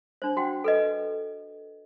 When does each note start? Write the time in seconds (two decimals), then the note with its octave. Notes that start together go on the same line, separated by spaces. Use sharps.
0.22 D4 C5
0.37 F#4 F#5 G5
0.64 A4 B4 D#5